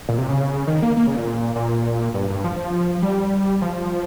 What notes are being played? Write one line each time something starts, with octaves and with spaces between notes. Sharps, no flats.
A#2
C3
C#3
D#3
A#3
A#3
C#3
A#2
A#2
G2
G2
F3
G3
F3